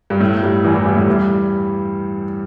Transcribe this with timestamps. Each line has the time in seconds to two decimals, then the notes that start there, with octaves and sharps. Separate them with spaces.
0.10 G2 G3
0.20 A2 A3
0.43 G2 G3
0.64 E2 E3
0.74 E2 E3
0.86 G2 G3
0.96 A2 A3
1.07 G2 G3